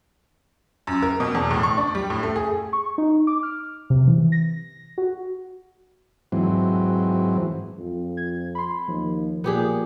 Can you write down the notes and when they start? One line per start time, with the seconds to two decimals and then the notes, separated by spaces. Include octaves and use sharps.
0.87 F#2
1.02 A#4
1.20 B2
1.35 E2
1.51 A2
1.63 C#6
1.78 D4
1.95 G3
2.10 A2
2.23 A3
2.36 G#4
2.73 C#6
2.98 D#4
3.27 D6
3.43 F6
3.90 C3
4.07 E3
4.32 A#6
4.98 F#4
6.32 G#2 E3 F#3 C4
7.79 F2
8.17 G#6
8.55 B5 C6
8.88 D#2 F3
9.44 A#2 B3 G4 G#4